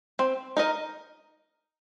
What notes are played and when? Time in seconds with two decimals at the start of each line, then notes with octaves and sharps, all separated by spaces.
0.19 C4
0.57 D#4 A#4 D#5